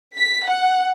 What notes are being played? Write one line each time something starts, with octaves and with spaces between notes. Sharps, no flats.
B6
F#5